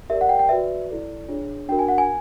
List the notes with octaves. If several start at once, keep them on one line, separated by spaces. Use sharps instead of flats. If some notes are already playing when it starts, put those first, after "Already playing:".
G4 A#4 D5 E5
F#5
G5
G5
F#4 B4 D5 E5
E4 A4 D5
D4 F4 G#4 C#5
D4 F#4 A#4 G5
G#5
F#5
G#5